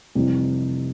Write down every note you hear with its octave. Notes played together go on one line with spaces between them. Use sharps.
F1 F2 C3 E3 G3